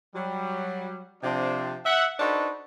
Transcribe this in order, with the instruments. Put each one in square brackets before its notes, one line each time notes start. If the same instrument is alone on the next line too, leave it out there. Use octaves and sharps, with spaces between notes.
[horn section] F#3 G3
C3 F3 C4 D4
E5 F#5
D4 D#4 F#4 A4 B4 C5